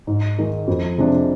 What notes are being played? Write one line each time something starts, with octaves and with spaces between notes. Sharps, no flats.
G#2
D#3 G#3 D#4
F2
C3 F3 G#3 D4